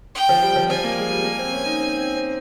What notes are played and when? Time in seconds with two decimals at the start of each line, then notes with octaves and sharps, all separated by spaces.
0.15 G5
0.29 F3
0.42 G3
0.56 F3
0.69 F3 G#5
0.84 A#3
0.97 G#3
1.11 G3
1.24 A#3
1.38 C4
1.52 C#4
1.65 D#4
1.79 C4
1.97 C4
2.15 C4